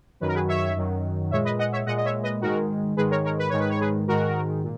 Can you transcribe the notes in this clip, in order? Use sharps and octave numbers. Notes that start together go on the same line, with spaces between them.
F#2 D#3 F#3 B4
A#4
G#4 B4
C#5 E5
F#2 D#3 F#3
A#2 G#3 C#5 E5
B4 D#5
D#5 F#5
C#5 E5
A#2 G#3 D#5 F#5
D#5
C#5 E5
B4 D#5
G#2 D#3 G#3 F#4 A#4
G#2 D#3 G#3 G#4 B4
A#4 C#5
A#4 C#5
B4
G#2 D#3 G#3 C#5
B4
C#5
G#4 B4
G#2 D#3 G#3 F#4 A#4
A#2